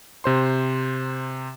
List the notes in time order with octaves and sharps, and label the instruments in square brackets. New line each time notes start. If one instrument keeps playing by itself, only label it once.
[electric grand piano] C3 C5 C6